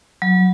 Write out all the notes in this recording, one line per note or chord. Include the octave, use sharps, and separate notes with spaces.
F#3